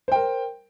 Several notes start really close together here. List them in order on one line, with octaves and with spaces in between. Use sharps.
C5 G5 A#4